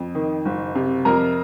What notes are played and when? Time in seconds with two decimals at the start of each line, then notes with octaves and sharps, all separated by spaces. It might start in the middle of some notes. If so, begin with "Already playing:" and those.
Already playing: F2
0.15 D#3
0.45 F#1
0.75 C3
1.05 F2 A#4 A#5